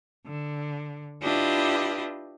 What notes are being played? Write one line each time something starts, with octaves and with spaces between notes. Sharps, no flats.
D3
D4 E4 F4 G4 B4 D#5